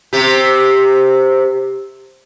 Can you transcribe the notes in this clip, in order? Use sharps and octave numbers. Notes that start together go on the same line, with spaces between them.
C3 G4